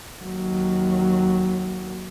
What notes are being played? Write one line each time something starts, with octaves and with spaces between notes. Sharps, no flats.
D#2 F#3